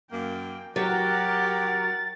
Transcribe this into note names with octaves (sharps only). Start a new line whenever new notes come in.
F#2 A#3 G5
F#3 F#4 G4 A#4 A6